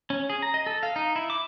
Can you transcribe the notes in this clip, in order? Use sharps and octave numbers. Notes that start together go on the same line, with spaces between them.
C#4
G#4
A#5
D#5
A4
F5
D#4
E4
D6